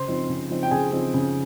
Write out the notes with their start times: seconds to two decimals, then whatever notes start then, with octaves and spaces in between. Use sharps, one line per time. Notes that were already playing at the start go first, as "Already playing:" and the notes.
Already playing: C#3 C5 C6
0.08 F3 C4 D#4
0.29 C#3
0.50 F3 C4 D#4
0.63 G5
0.71 C#3 G#4 G#5
0.92 F3 C4 D#4
1.14 C#3